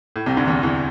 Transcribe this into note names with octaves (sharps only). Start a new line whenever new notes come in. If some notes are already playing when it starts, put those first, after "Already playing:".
A2
C2 C3
D2 D3
E2 E3
E2 E3